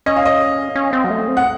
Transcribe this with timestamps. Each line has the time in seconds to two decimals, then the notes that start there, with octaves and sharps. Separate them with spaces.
0.06 C#4 D#5
0.16 F5
0.26 D#5
0.75 C#4
0.93 C4
1.04 F#3
1.10 A3
1.28 C4
1.37 F#5